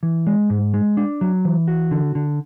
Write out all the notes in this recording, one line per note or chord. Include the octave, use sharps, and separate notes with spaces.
E3
G#3
G#2
G#3
D4
F#3
E3
F#4
D3
D3